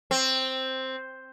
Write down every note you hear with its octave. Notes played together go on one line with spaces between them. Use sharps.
C4